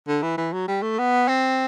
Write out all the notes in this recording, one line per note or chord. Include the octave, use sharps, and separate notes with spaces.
D3
E3
E3
F#3
G3
A3
B3
C4